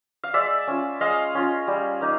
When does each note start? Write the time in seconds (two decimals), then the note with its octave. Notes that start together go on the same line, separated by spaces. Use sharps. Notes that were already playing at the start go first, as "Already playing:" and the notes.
0.24 F5
0.34 G#3 D5 E5
0.67 C#4 F4
1.00 G#3 D#5 F5
1.35 C#4 F4
1.67 G3
2.01 A#3 D#4